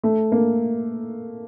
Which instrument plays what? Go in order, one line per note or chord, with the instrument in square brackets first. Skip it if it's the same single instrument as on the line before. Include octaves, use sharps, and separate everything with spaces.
[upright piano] A3
A#3